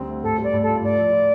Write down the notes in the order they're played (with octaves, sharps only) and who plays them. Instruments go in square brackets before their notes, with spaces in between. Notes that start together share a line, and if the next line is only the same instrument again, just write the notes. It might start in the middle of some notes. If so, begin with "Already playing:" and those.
Already playing: [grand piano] D2 G3 C4
A3
[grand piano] A2 [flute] A4
[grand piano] G3
[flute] D5
[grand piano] A2
[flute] A4
[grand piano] F4
[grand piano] A2 [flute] D5
[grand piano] F3
F4